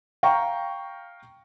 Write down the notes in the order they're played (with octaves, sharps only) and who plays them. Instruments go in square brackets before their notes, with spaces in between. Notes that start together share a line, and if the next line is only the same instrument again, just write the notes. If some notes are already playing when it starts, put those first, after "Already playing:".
[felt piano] F5 G5 A#5 C#6